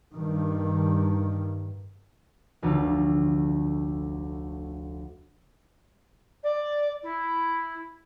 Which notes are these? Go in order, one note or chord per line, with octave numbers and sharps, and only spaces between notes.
G2 D#3
F1 D2 F4
D5
E4